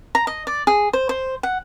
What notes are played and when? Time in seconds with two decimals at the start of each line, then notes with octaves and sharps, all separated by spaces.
0.15 A#5
0.27 D#5
0.47 D5
0.67 G#4
0.93 C5
1.09 C5
1.43 F#5